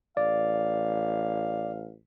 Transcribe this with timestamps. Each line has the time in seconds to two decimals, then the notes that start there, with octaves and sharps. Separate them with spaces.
0.17 A1 D5 F5